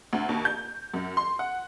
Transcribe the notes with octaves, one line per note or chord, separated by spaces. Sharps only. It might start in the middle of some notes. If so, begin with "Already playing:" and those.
D2
D#2
G6
F#2
C6
F#5